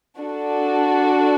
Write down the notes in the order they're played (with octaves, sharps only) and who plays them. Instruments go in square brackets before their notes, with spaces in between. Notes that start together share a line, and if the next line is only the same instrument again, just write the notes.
[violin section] D4 F#4 A4